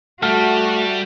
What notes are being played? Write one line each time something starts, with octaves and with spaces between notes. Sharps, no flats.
G3 A3 F#4 F#5 A5 F6